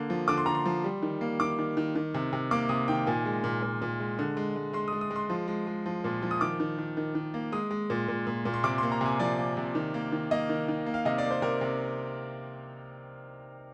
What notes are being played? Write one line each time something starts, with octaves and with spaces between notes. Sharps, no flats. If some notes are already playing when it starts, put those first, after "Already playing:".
Already playing: D3 A#3
F3
D3 D6
C6
D3 A#5
C6
F3
G3
D#3
A#3
D#3 D6
D#3
D#3
D#3
C3
C3
A#3 D6
C3 D#6
D#3 G5
A#2 G#5
G#3
A#2
A#2
A#2
G#3
D3
G#3
G#3
G#3 C6
D#6
G#3
D#6
G#3
C6
F3
G#3
G#3
F3
A#2
F3
D#6
D#3 D6
D#3
D#3
D#3
D#3
A#3
G#3 D#6
G#3
A#2
A#2
A#2
A#2
C6
C3 D6
A#3 C6
A#5
C3 G#5
F3 D5
A#3
C3
D#3
A#3
D#3
A#3 D#5
D#3
D#3
A#3
F5
C3 D#5
D5
A#3
C5
C3 A#4
C3